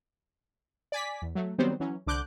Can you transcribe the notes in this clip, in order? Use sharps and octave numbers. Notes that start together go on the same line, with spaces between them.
D5 G#5 B6
E2
F#3 A3
D#3 F#3 G3 B3 C4 C5
E3 F#3 C#4
C2 D3 D6 F#6 G6